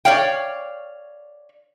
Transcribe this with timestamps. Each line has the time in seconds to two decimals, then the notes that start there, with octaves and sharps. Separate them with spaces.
0.05 C#5 D5 F5 G5